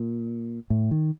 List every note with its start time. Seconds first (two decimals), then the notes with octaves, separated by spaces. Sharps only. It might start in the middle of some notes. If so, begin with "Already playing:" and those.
Already playing: A#2
0.70 A2
0.91 D#3